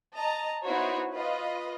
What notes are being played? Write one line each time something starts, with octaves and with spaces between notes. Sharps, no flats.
D#5 A5 A#5
B3 D#4 E4 F#4 C5 C#5
F4 B4 D#5